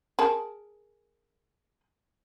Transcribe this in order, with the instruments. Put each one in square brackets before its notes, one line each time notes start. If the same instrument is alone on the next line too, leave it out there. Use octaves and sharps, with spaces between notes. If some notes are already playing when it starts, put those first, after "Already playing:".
[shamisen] G#4 A#4 A5